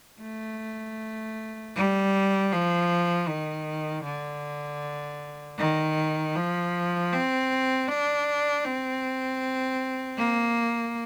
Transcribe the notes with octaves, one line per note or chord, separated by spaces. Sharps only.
A3
G3
F3
D#3
D3
D#3
F3
C4
D4
C4
A#3